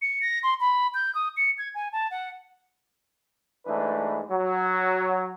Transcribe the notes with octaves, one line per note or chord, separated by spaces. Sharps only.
C#7
A#6
C6
B5
G6
D#6
C#7
G#6
G#5
A5
F#5
G#2 E3 A3 D4 B4
F#3